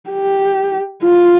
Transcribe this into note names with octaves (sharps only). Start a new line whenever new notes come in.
G4
F4